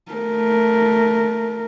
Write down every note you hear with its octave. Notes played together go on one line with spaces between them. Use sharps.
A3 A#4